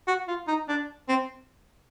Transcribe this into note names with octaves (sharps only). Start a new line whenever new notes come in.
F#4
F4
D#4
D4
C4